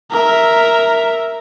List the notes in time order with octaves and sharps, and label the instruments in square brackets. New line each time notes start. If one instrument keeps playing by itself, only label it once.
[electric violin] A#4 E5